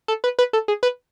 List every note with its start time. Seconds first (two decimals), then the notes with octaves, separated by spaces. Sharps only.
0.08 A4
0.24 B4
0.39 B4
0.53 A4
0.68 G#4
0.83 B4